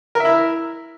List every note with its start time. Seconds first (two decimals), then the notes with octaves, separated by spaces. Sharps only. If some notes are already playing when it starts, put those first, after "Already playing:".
0.15 A#4
0.20 E5
0.25 E4